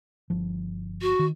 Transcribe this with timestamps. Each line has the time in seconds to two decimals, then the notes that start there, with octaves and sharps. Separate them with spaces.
0.30 G1 F3
1.02 F#4
1.19 D#3